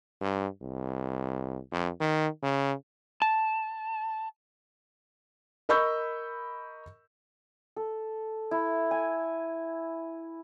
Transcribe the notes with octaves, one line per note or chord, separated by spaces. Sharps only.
G2
C2
F2
D#3
C#3
A5
A#4 D#5 B5 C#6 E6 G6
A4
E4
G#5